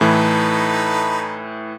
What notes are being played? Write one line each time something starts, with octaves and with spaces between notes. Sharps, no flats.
A2 E3 D#4 A4 B4